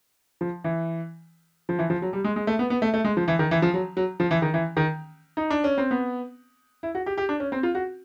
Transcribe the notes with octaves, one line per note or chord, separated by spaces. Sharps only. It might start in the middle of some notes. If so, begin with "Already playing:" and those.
F3
E3
F3
E3
F3
F#3
G3
G#3
G#3
A3
B3
B3
A3
A3
G#3
F3
E3
D#3
E3
F3
F#3
F#3
F3
E3
D#3
E3
D#3
D#4
D4
C#4
C4
B3
E4
F#4
G4
G4
D4
C#4
C4
F4
F#4